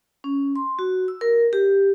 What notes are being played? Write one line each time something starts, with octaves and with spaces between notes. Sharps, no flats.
C#4
C6
F#4
E6
A#4
G4